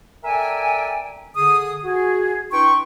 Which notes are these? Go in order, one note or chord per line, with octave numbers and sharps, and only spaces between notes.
A4 A#4 D5 E5 G5 G#5
D3 G#4 D#6
F#4 G#4
D4 E4 B4 G5 C6 C#6